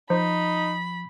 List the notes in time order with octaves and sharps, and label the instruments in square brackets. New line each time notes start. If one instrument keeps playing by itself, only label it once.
[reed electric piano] F3 [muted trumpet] D#4 [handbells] C5 [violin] B5